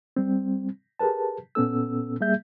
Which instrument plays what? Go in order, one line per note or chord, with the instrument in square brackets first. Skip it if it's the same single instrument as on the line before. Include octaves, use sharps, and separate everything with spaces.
[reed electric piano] G3 C4
G4 G#4 A#4 B4 A5
A#2 B3 C#4 A4 E6
G3 A#3 G#4 E5 G6